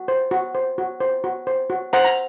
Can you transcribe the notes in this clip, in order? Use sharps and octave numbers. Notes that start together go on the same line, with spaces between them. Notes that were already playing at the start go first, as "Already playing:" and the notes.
Already playing: F#4
C5
F#4
C5
F#4
C5
F#4
C5
F#4
C5 F#5 A#5
A#5